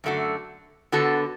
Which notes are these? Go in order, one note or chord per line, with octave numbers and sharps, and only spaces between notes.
F#2 D3 A3 F#4
D3 B3 F#4 A4